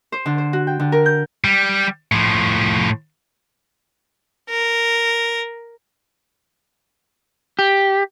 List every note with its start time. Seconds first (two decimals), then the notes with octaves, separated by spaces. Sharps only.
0.12 C5
0.26 D3
0.38 C5
0.53 F#4
0.67 G5
0.80 D3
0.92 A#4
1.06 G6
1.44 G3
2.12 A2 F3
4.50 A#4
7.59 G4